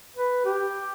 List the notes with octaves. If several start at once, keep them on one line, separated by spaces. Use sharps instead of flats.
B4
G4